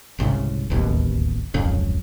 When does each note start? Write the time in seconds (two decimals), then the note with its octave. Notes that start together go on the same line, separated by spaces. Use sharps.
0.18 G1 C2 G#2 C#3
0.70 D1 A1 D#2 B2
1.54 D1 G#1 F2 C#3